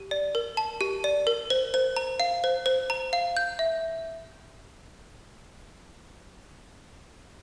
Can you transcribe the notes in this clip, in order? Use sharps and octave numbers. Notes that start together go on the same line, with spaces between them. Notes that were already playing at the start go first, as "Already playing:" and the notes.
Already playing: G4
D5
A#4
A5
G4
D5
A#4
C5
C5
A#5
F5
C5
C5
A#5
F5
G6
E5